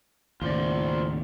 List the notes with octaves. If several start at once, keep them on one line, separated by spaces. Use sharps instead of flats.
D#2 A2 C#3 F4 C5 D5